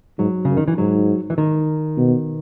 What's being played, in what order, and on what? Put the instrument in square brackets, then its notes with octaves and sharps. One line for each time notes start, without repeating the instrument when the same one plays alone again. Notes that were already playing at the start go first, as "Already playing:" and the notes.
[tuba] G#2 [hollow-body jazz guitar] F#3
[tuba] F#2 [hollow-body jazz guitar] C#3
[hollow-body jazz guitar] D#3
E3
[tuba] G#2 [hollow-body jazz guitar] F#3
[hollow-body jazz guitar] E3
D#3
[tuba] B2